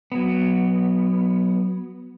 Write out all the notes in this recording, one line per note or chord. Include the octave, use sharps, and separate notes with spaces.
F#3 B3